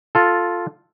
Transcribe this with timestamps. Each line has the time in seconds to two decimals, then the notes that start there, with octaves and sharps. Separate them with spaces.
0.15 F4 A4